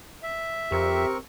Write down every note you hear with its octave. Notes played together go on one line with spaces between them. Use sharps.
E5
F2 C4 G4 A#4 C#6